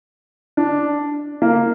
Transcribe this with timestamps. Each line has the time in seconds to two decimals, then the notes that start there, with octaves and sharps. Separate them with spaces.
0.57 D4
1.42 A#3